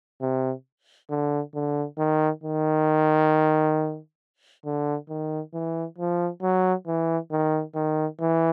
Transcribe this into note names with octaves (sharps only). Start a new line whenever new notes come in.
C3
D3
D3
D#3
D#3
D3
D#3
E3
F3
F#3
E3
D#3
D#3
E3